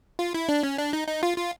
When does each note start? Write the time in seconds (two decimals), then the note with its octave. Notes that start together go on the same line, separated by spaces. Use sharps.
0.19 F4
0.34 E4
0.49 D4
0.63 C#4
0.78 D4
0.93 D#4
1.08 D#4
1.23 F4
1.38 F4